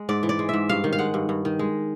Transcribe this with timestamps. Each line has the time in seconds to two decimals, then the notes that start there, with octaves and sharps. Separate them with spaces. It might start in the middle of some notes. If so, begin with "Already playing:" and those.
Already playing: G#3
0.09 G#2 D5
0.23 E3
0.29 D5
0.39 G#3
0.49 G#2 E5
0.69 G2 F5
0.84 D#3
0.93 F5
0.99 G#3 F#5
1.14 G2
1.29 G2
1.45 D#3
1.59 G#3